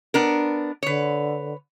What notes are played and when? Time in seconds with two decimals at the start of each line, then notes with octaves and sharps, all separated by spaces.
0.14 B3 D4 A#4
0.83 D3 B4 C#5